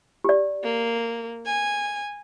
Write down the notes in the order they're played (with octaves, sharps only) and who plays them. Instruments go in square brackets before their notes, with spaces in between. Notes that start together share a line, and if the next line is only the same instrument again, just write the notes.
[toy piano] G4 D5
[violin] A#3
G#5